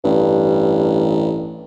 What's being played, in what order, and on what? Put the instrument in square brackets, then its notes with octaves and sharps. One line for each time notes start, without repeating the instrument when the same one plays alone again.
[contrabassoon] A1 [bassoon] G2